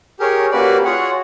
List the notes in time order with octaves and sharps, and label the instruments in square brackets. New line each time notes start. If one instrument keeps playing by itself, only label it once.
[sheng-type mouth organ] G4 A#4 C#5 [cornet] G#4
[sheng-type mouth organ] A#3 C#4 F#4 B4 D5 [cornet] G4
[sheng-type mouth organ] F4 G#4 C#5 F#5 [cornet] F#4